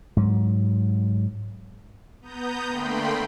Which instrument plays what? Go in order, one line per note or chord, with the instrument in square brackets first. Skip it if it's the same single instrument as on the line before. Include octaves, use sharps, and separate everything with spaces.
[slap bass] G#2 F#3
[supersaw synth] B3 A#5 D#6 G6
D3 A3 A#3 G5 B5 C6